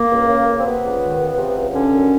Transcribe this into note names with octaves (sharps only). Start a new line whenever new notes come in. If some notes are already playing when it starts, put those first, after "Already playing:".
Already playing: A#3
C#2
C#3
C#2
C4
C3 B3
C#2
D#3
C#2
C3
C#2
D3 C#4
F#2